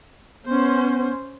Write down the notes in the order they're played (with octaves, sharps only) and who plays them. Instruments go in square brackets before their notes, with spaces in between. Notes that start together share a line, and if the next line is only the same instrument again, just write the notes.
[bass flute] B3 [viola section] C#4 C5